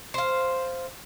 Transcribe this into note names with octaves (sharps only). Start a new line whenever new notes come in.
C5 F5